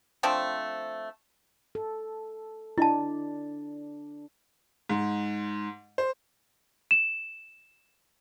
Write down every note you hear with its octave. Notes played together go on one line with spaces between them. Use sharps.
F3 A3 C4 D4
A4
D4 E4 D#5 A5
G#2
C5
E7